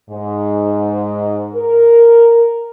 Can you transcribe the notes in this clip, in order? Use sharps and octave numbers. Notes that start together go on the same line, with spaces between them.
G#2
A#4